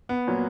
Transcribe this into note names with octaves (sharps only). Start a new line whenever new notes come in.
B3
A#2 F#3 A#3